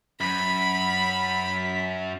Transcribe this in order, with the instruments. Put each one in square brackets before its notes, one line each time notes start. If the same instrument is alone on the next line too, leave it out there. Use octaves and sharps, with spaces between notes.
[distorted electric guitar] F#2 [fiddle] B5 [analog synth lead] B6